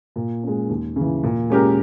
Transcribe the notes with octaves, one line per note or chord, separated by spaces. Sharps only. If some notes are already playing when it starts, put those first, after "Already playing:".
A#2
G#3 C#4
D#2
C#3 E3
A#2
G#3 C#4 G4 A#4